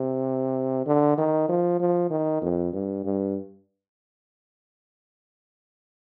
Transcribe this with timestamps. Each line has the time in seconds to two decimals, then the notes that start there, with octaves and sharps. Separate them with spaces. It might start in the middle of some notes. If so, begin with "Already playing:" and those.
Already playing: C3
0.86 D3
1.18 D#3
1.49 F3
1.80 F3
2.11 D#3
2.42 F2
2.73 G2
3.05 G2